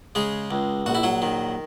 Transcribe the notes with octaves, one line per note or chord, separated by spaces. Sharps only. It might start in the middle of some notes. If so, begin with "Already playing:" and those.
C#3 G#3 G#4
C#2
A#1 F#4
E4
F#3 F#4
D#3